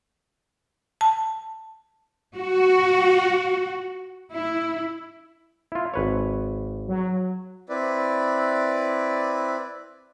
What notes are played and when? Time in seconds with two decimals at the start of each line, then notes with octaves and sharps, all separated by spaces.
1.01 A5
2.36 F#4
4.33 E4
5.72 E4 F4
5.94 G#1 B4 C#5
6.88 F#3
7.69 C4 E4 B4 D5